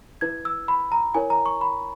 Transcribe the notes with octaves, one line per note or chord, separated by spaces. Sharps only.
E4 B4 G#6
E6
B5
A#5
E4 A#4 C#5 G#5
A#5
C#6
B5